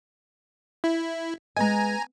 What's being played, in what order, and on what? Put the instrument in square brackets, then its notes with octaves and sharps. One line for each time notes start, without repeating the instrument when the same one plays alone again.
[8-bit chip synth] E4
[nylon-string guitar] G#3 B3 D#5 [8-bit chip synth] G#5 A#5